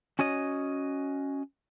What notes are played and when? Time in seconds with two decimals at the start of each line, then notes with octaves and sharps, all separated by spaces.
0.19 C#4 F#4 C#5 D#5